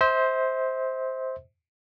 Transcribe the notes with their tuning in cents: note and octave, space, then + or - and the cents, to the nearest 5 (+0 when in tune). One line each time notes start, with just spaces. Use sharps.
C5 +0 E5 -40